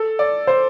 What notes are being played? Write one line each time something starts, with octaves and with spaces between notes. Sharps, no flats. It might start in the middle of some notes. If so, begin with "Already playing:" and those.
Already playing: A4
D5
C5